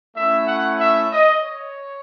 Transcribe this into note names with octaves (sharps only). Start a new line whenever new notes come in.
A3 C#4 E4 E5
F#5
E5
D#5
C#5